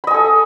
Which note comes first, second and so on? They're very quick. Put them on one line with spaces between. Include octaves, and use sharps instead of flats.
B5 D#5 G#5 A4